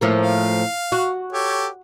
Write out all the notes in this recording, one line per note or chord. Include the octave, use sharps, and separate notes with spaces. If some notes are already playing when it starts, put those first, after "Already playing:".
A2 F3 A#3
F5
F#4
G4 A4 C#5